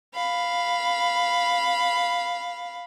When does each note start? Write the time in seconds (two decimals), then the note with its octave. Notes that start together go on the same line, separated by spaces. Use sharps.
0.14 F5 B5